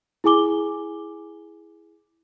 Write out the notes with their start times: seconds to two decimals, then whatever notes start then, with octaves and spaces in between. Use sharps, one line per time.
0.24 E4 G#4 G#5 D6 G7